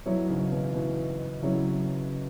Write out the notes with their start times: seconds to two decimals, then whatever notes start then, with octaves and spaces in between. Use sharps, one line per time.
0.06 B2 F#3 E4 C#5
0.29 G#2 C#3
0.51 B2 E3
0.74 B2 E3
1.43 C#3 F#3 E4 C#5